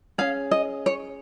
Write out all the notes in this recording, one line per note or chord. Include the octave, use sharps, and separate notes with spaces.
C#4 G#4 F5
D#5
C#5